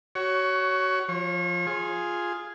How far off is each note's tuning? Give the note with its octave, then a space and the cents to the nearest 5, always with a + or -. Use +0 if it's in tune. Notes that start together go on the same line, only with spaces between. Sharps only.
F#4 +25 C#5 +10
F3 +0 C#5 -40
F4 +0 G#4 +0